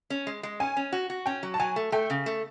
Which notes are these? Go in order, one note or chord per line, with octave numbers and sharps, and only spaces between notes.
C#4
G#3
G#3
C#4 G#5
C#4
F#4
F#4
C#4 G5
F#3
A5
F#3 G#5
A3
A3 G5
C#3
A3